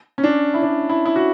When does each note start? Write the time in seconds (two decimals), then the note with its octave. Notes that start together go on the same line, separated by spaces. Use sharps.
0.18 C#4
0.24 D4
0.54 E4
0.62 D4
0.89 E4
1.05 E4
1.16 F#4